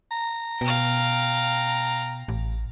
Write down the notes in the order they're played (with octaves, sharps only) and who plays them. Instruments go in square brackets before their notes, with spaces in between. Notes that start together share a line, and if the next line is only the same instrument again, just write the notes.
[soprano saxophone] A#5
[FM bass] B2 [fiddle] F5 G5
[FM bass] A1